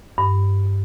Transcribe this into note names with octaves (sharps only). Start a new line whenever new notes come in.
G2